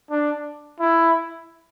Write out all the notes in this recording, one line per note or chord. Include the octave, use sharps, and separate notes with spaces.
D4
E4